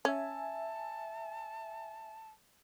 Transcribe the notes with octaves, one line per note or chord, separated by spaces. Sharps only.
C#4 E5 G#5 A5